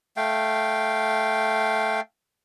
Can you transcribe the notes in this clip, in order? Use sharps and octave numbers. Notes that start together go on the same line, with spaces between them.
A3 F5 G5